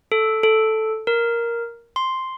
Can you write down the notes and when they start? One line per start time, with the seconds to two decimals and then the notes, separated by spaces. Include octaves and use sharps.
0.12 A4
0.43 A4
1.07 A#4
1.96 C6